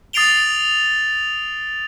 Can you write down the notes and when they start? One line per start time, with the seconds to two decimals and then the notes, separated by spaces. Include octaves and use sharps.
0.13 D#6 A6 C7 D7 F7 G7